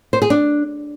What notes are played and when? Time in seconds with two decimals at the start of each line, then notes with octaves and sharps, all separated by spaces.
0.13 C5
0.22 G#4
0.30 D4